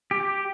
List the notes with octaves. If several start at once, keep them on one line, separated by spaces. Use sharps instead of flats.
G4